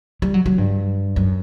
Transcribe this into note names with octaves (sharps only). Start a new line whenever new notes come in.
G3
F#3
F#3
G2
F#2